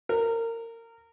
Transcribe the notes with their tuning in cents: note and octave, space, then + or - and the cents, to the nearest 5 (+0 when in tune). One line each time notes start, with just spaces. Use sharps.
A#4 -25